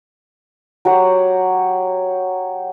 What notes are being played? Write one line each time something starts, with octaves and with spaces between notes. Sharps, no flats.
F#3 G4 F#5